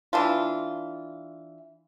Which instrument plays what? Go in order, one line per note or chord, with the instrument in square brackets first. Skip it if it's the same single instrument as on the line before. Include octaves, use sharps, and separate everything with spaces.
[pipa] E3 D4 F4